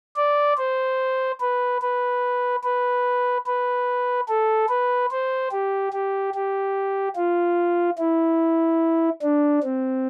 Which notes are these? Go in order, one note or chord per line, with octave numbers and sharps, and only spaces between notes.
D5
C5
B4
B4
B4
B4
A4
B4
C5
G4
G4
G4
F4
E4
D4
C4